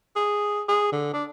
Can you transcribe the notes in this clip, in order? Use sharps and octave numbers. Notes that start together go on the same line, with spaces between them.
G#4
G#4
D3
D4